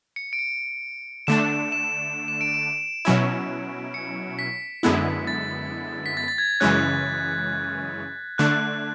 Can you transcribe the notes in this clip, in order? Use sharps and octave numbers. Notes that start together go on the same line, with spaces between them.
C#7
D7
C#7
D3 A3 D4 E7
E7
E7
D7
E7
B2 F#3 C#4 E4
C#7
B6
F#2 D3 G#3 B3 E4
A6
B6
A6
A6
G#6
F#2 C#3 E3 G#3 C#4 F#6
D3 A3 D4 F#6